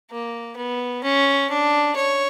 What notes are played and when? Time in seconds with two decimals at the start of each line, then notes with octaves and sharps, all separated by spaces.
0.11 A#3
0.57 B3
1.03 C#4
1.50 D4
1.96 C#5